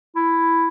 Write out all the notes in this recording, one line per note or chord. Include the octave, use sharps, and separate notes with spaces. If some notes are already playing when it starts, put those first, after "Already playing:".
E4